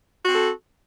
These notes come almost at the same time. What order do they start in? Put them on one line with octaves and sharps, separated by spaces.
F#4 C4 A4